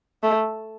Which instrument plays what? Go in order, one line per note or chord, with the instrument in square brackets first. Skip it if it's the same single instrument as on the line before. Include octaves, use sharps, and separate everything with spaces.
[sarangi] A3